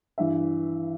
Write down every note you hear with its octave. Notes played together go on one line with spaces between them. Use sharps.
G2 E3 E5